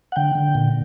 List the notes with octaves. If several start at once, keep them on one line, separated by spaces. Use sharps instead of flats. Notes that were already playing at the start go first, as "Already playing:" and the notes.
F#5
D3 G5
D3
A#2